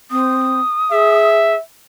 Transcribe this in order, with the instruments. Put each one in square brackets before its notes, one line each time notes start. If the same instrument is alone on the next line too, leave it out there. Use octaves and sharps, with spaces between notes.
[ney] C4 [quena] D#6
[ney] G#4 [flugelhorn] E5